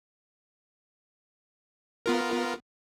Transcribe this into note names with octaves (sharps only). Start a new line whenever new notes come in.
B3 F4 A#4